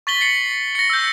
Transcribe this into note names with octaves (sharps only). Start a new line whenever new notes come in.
C#6 A6 B6 F#7 G7
C7 C#7 F#7
A#6 C#7
E6 G6